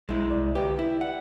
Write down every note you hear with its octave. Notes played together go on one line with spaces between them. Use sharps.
B1 G#3 E4
C2 D5
D2 G4 B4 D5 G5
E4
F#5